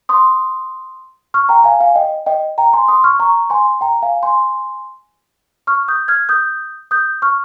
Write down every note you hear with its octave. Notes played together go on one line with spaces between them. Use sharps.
C6 D#6
C#6 F6
G5 A#5
F5 G#5
F5 G#5
D#5 G5
D#5 G5
G5 A#5
G#5 C6
C6 D#6
C#6 F6
A#5 C#6
G#5 C6
G5 A#5
F5 G#5
G#5 C6
C#6 F6
D#6 G6
F6 G#6
D#6 G6
D#6 G6
C#6 F6